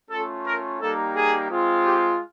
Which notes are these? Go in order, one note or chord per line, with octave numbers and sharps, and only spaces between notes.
A3 C#4 F4 A4
A#4
G3 A#3 D#4 G4 A4
G#4
G#3 C4 F4
G4